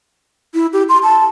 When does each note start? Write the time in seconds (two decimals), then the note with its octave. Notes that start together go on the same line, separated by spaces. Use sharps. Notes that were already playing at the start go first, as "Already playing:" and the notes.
0.54 E4
0.73 G4
0.89 C6
1.03 A5